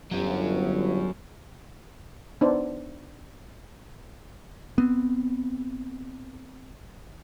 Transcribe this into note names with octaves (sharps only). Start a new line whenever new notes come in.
G1 F#3 C#4
B3 D4 D#4 C5
B3 C4